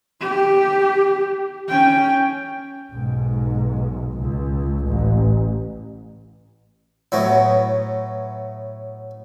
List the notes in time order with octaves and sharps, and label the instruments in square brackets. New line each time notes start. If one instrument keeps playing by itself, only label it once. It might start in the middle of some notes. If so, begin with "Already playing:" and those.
[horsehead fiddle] G4
C#4 G5
[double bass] B1 G#2
C#2
A1
[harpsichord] A2 F#3 B3